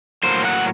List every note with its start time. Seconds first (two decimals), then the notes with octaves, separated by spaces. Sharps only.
0.23 A2 F#3 A#3 C5
0.45 F#5